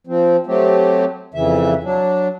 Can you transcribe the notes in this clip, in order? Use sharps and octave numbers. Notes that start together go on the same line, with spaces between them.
F3 C4
F#3 A3 C4 G4
F2 C#3 E3 E5
F#3 D4